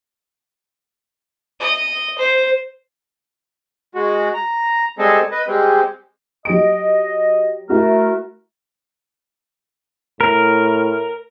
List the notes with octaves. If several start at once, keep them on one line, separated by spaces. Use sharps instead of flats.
D#5
C5
G#3 F#4
A#5
G3 G#3 C4 G#4 A4 D#5
B4 D#5
G3 G#3 C4
F#3 G4 D#5 D7
A3 E4 F#4 A#4 E5
A2 A#4